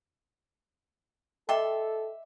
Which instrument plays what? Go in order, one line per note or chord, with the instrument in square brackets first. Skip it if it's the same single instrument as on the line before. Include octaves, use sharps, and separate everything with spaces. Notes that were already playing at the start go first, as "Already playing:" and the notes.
[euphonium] A4 [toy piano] D#5 G5 D6 [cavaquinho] E5 C6